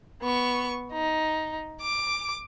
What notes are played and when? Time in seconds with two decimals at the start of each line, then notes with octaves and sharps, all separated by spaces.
0.22 B3 C#6
0.92 D#4
1.81 D6